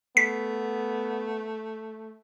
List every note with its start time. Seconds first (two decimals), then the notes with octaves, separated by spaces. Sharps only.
0.17 A3 B3 B6